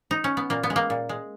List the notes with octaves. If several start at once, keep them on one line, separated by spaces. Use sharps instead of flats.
D#4
C#4
B3
A#2 A#3
B3
G#3
A#3
A#2
G#3